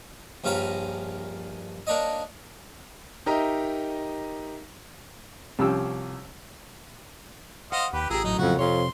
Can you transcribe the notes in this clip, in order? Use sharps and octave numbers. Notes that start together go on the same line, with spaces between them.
A#1 G2 C#4 F4 A#5 B5
A#3 D4 C#5 D#5
D#4 G4 A#4 D#5 E5 A#5
C2 F3 C#4 G4 E6
C5 D#5 F5 F#5
D#2 G4 B4
A1 F4 G4 G#4 A#4 E6
F#2 A2 F#3 D#4
F2 C#3 F#4
F2 C3 C#5 C6